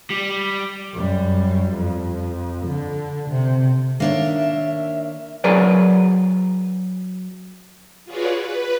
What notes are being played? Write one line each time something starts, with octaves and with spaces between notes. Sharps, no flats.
G3
F#2 G3
F2
D3
C3
D#3 A#3 D4 C#5 E5
F#3 G#4 A#4 B4 D5
F4 F#4 G#4 B4 C#5 D5
B4